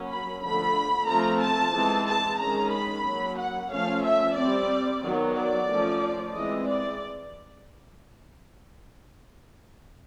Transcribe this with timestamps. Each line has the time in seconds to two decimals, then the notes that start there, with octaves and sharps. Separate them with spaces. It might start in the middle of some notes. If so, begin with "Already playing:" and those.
Already playing: F#3 A#3 C#4
0.09 B5
0.42 D3 F3 A3 B5
1.08 F3 A3 C4 A#5
1.41 A5
1.74 E3 G#3 C4
2.07 A5
2.40 D#3 G#3 C#4 A#5
2.73 B5
3.05 F#3 A#3 C#4
3.39 F#5
3.71 F3 A3 C#4 F5
4.04 E5
4.37 G3 C4 D5
5.03 D#3 F#3 B3
5.36 D5
5.70 F3 A3 C#4
6.35 E3 G#3 C4 D#5
6.68 D5